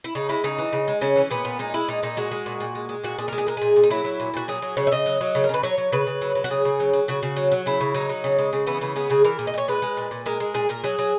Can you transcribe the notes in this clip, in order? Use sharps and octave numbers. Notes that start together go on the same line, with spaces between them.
E4
C#3 D#4
G#3 E4
C#3 D#4
E3
C#3
G#3
C#3 C#4
E3
A#2 B3
A#2
G#3 D#4
G#3 E4
A#2 D#4
A#2 D#4
G#3 F#4
G#3
A#2
A#2
G#3
G#3
A#2 F#4
A#2 G#4
G#3 A#4
G#4
G#3 A#4
A#2 G#4
A#2
D#4
F#3 E4
F#3
A#2
A#2 F#4
F#3 G#4
F#3
C#3 C#5
E5
C#3 D#5
F#3
F#3
C#3
A#4
C#3 B4
F#3 C#5
F#3
C#3 B4
C#3
F#3
F#3
F#4
C#3 G#4
C#3
F#3
F#3
C#3 F#4
C#3
F#3
F#3
C#3 E4
C#3
F#3 D#4
F#3
C#3
G#3
C#3
E3 B3
C#3 B3
G#3 B3
C#3 G#4
E3 A#4
A#2
D#5
A#2 C#5
G#3 B4
G#3
A#2
A#2
G#3 A#4
G#3
A#2 G#4
A#2 A#4
F#3 G#4
F#3